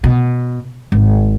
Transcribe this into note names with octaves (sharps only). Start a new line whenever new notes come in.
B2
G#1